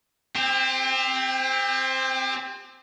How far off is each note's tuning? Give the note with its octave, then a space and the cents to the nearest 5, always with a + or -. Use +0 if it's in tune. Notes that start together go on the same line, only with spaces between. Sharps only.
C4 +0 G4 +40